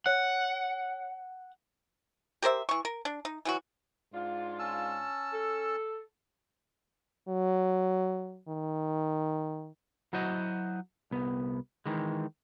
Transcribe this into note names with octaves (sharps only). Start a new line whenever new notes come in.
C#5 F#5 F#6
G4 A#4 C5 E5
E3 C#6
A#4
D4
D#4
E3 F#3 F#4
G#2 D4 F4
C#4 A5 E6
A4
F#3
D#3
F#3 E4 F#4 C5 D#5
C2 B3
D#3 E3 G#3